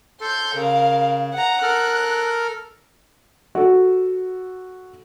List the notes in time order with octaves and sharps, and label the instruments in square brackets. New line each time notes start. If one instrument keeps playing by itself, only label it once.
[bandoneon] A4 [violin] C6 G6
[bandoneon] C#3 [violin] A#4 F5
[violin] F#5 A#5
[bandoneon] A4 A#4 F6 [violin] F#6
[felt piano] F#4 A4